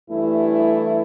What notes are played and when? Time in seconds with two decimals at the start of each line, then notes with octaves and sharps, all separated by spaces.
0.11 G2 E3 A3 E4